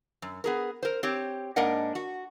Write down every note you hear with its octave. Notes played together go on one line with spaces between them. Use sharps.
F#2
B3 G#4 A#4
A#4 C5
C4 G4 C#5
G#2 A#3 D4 A#4 D#5 F#5
F#4